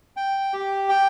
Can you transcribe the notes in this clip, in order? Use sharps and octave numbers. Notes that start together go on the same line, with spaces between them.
G5
G4
G5